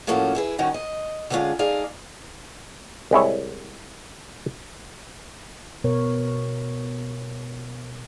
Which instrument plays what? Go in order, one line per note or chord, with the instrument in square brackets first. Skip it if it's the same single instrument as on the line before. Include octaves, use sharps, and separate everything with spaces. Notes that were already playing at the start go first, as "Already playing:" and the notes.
[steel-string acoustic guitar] A2 F3 A#3 C#4 F#4 A4
E4 G#4 B4
D#3 G3 C#4 D#4 F#4
D#5
D3 G3 G#3 C#4 F4 G#4
A3 D#4 G#4 D5 F5
[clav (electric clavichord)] C2 G#3 E4 C#5
[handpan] B2 B3 A#4 C#5